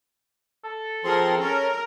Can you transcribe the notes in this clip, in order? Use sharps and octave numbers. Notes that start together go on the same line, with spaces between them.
A4
F3 C4 G#4 A#4 C6
C#4 A#4